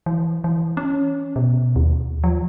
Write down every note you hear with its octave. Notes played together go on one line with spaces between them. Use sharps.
E3
E3
C#4
B2
D#2
F3